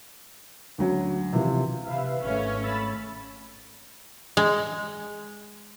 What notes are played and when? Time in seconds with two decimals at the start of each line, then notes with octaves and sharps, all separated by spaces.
0.78 D2 F#3 C#4
1.33 C3 E3 F3
1.84 C3 B4 E5 F5
2.23 G#1 A3 C#4
2.63 B5 E6 A6
4.37 G#3